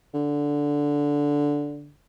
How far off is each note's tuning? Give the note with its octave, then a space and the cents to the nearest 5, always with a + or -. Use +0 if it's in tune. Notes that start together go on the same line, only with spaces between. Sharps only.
D3 -10